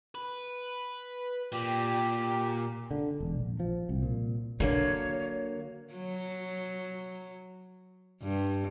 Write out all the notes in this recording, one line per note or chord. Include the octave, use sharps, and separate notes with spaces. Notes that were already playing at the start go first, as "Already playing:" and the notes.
B4
A#2 G4
D3
E1
A#1
F3
C2
A#2
D3 F#3 A#3 C#5
F#3
G2